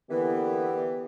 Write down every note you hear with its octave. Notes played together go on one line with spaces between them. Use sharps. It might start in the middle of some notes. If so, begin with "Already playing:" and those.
D3 E3 A#3 B3 G4